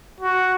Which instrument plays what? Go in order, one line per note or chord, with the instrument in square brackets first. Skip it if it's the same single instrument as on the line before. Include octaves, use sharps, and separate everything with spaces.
[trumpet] F#4